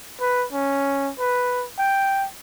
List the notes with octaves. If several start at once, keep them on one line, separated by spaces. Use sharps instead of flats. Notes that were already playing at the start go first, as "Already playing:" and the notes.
B4
C#4
B4
G5